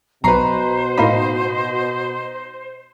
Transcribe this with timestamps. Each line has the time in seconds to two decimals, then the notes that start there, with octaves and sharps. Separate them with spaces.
0.24 B1 B2 B4 C5 A#5 C#6 C7
0.98 A2 A#3 D#4 B5